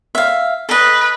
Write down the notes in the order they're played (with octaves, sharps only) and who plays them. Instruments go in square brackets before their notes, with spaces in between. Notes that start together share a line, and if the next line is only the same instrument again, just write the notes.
[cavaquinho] E5 F5
[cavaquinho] A4 D#5 [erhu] B4